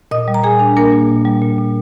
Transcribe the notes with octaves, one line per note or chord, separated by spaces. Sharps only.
A#2 D#5 D#6
G3
A#5
A#2 G#4 G#5
D4
A#3 D4 A#4
A#2
A#2
G3
A#2
A#2